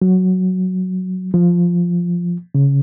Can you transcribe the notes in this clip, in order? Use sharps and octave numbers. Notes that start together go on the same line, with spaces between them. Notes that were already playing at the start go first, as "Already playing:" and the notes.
F#3
F3
C#3